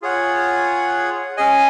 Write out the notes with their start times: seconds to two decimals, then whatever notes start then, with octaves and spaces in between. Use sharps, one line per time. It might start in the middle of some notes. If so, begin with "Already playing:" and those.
0.02 F4 G#4 C#5 F#5
1.37 C#4 G#4 D#5 G#5